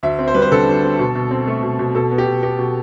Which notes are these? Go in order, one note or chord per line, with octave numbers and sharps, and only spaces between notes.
D2 E5
C4
C5
G3 B4
C5
D3 A4
D2
C4
B2
B2
C4
A3
B2
B2
B2 A4
B3
G4
B2
B3 G4
B2